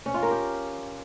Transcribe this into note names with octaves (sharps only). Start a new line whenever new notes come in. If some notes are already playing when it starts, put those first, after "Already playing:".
C#4
F4
A#4
G4